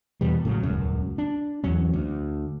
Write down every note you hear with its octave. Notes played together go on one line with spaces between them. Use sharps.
E2 B2 G3
A2 C#3 F#3
D#1 C#2 F#2
D4
E2 F#3 C#4
D2